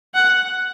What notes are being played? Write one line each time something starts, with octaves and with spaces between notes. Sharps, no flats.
F#5